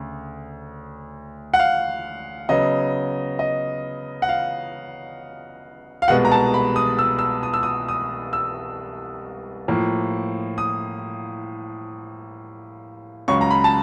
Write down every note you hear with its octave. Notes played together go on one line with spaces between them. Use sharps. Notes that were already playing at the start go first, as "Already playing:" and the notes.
Already playing: D2 C#3
F#5
F5
C#3 F#3 B3 D#5
D#5
F#5
F5
F5
C2 B2 G#3 B3 F#5
A#5
A5
B5
D#6
E6
E6
D#6
E6
D#6
D#6
E6
A2 F3 A#3
D#6
C#2 C#3 F#3 C#6
A#5
B5
A5